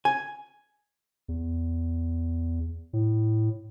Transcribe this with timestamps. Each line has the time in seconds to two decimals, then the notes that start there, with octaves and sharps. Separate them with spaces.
0.05 G#5
1.28 E2
2.93 A2